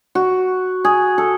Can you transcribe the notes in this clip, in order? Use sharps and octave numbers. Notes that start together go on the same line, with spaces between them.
F#4
G#4
A4